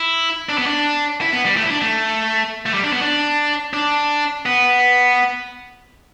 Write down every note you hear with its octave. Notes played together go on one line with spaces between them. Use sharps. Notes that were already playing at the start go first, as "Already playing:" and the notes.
Already playing: E4
D4
B3
D4
E4
B3
G3
A3
E4
D4
A3
A3
G3
D4
B3
D4
D4
B3